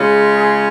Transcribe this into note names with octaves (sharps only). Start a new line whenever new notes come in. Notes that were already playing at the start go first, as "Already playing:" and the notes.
Already playing: C#3 G#3 C#4 F4
G#4